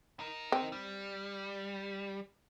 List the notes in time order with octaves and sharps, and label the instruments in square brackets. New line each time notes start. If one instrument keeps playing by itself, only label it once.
[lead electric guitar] D#4 A#4
[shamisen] C4
[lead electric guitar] G3